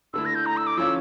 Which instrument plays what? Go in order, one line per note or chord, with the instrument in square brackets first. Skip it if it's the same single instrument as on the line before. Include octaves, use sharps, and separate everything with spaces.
[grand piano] D3 A3 E4 [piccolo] E6
[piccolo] A#6
G6
A#5
E6
D6
[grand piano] F3 C#4 F4 [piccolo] E6